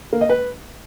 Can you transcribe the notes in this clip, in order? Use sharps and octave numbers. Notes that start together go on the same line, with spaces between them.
A#3
D#5
B4